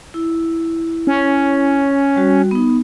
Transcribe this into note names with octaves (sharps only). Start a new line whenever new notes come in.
E4
C#4
G3 F#4
B3 D#4